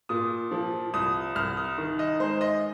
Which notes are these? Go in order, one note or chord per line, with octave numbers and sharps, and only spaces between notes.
A#2 D#6
F3
C2 D#6
C2 F6
D#6
D#3
D#5
G#3 C5
D#5